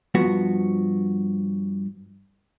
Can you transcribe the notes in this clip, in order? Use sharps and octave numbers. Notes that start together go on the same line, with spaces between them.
G2 F3 B3 F#4